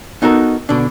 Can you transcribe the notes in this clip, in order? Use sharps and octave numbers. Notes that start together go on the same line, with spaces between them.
B3 D#4 F#4 A4 A#4
B2 D3 D4